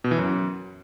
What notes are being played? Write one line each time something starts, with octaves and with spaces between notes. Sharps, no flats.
B2
E3
F#2